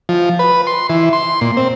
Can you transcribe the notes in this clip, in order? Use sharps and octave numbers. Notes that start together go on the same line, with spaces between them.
F3
B4
C6
E3
C6
A#2
C4